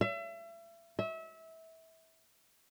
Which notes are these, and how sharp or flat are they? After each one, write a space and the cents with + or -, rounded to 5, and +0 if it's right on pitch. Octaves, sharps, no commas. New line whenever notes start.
E5 +35
E5 -25